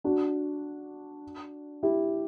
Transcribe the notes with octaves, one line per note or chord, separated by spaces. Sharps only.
D4 F#4
E4 G4